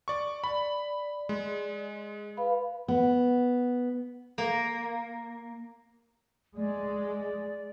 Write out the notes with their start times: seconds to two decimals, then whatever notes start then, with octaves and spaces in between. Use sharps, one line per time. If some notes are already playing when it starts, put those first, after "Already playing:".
0.08 D5 C#6
0.44 D5 B5
1.29 G#3
2.37 B4 F5 B5
2.88 B3
4.38 A#3
6.56 G#3 D5